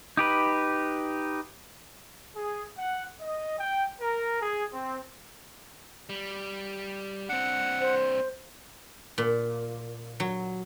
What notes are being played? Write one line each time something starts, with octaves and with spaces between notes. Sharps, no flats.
D#4 G4 B4
G#4
F#5
D#5
G5
A#4
G#4
C4
G3
C4 D4 F#5
C5
A#2
F#3